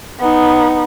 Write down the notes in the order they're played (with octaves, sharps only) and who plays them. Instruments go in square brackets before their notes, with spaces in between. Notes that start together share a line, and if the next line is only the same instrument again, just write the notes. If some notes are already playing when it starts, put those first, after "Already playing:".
[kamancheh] B3 D#4